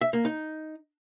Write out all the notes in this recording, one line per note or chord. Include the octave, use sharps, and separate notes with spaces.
E5
A#3
D#4